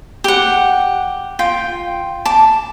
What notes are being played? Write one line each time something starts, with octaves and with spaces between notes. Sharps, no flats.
G4 F#5
F4 G5
A5 D6